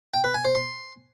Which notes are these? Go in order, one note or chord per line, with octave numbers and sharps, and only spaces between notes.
G5
B4
G#5
C5
C6